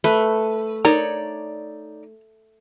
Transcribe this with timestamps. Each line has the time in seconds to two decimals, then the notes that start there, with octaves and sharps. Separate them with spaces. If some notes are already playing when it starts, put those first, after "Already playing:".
0.04 A3 B4
0.85 D#4 A#4 C#5 D5